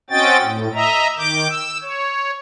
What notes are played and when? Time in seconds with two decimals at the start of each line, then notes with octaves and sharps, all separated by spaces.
0.10 C4 C#4 F#4 D#5 G5 A6
0.41 A2
0.73 D#5 E5 A#5
1.18 D#3 D6 G6
1.50 E6
1.82 C#5